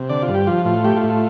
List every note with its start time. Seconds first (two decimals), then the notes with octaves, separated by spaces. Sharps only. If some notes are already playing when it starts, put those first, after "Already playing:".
Already playing: C3
0.09 D3 D5
0.22 F4
0.28 G2
0.35 G4
0.47 F3 F4
0.65 A2 F4
0.84 A3 G4
0.97 F4
1.04 A2
1.10 F4